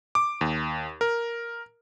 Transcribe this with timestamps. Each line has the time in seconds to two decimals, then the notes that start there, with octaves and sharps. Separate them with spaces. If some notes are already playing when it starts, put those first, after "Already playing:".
0.15 D6
0.41 D#2
1.01 A#4